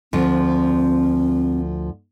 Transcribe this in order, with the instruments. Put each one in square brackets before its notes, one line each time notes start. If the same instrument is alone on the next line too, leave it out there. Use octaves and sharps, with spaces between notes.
[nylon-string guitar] D2 F3 [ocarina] C4